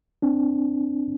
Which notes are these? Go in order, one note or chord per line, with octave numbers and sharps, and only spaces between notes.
C4 D4